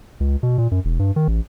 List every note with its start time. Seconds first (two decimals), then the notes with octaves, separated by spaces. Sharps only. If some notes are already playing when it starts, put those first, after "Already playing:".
0.20 C#2
0.43 B2
0.58 A#2
0.71 F#2
0.85 E1
0.99 G2
1.16 D#3
1.28 A1